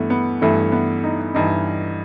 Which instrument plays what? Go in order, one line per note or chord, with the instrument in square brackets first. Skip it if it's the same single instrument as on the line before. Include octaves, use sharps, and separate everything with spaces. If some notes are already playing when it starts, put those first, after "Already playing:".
Already playing: [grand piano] G2 E3 A3 B3
B3
G2 E3 A3
B3
D#4
G2 E3 D#4